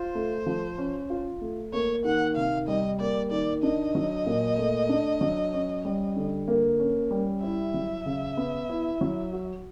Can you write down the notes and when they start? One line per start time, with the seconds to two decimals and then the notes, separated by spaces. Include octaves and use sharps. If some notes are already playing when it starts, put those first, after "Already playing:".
Already playing: F4 C5
0.15 A3
0.46 F3
0.78 C#4
1.10 F4
1.41 A3
1.73 A#3 C#5
2.05 D#3 F#5
2.36 C3 F5
2.68 G3 D#5
3.00 A#3 D5
3.31 D#3 D5
3.63 D4 D#5
3.95 F#3
4.26 A#2
4.58 A3
4.89 D4
5.21 F#3
5.53 C#4
5.85 G3
6.16 D3
6.48 A#3
6.79 C#4
7.11 G3
7.43 E4 E5
7.74 F#3
8.06 C#3
8.37 B3
8.69 E4
9.01 F#3
9.33 F#4